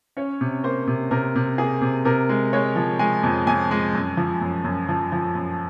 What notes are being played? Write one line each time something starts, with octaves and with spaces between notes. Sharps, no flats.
C#4 C#5
C3
A#3 C5
C3
C3 A#4
C3
A#3 G#4
C3
C3 A#4
G#3
G#3 C#5
F3
G#3 G#5
F2
F2 G#5
G#3
F#2
F3
F#2
F#2
F3
F3
F#2